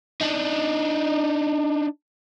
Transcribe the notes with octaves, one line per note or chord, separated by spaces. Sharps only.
D4 D#4